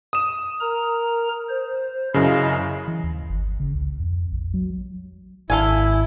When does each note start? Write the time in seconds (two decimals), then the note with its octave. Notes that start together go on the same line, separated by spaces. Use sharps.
0.13 D#6 E7
0.60 A#4 A#5
1.49 C5
2.14 F#2 C#3 E4 D#5 F5
2.88 E3
3.04 D#2
3.29 G1
3.60 C#3
3.75 C#2
4.00 F2
4.32 A#1
4.54 F#3
5.50 G#1 E4 A4 F5 G#5